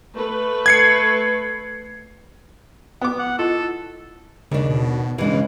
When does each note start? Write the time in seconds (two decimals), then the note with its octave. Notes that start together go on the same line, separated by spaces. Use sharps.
0.15 A3 B4
0.66 G#6 C7 C#7
3.01 B3 D6
3.19 F#5
3.39 E4 F4 A4 D#5
4.51 D#2 C#3 D4
4.70 B2
5.18 C#3 E3 G#3 D4